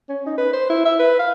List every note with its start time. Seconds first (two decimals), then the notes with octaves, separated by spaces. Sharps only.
0.09 C#4
0.26 D#4
0.38 B4
0.53 C5
0.70 E4
0.85 E5
0.99 B4
1.19 F5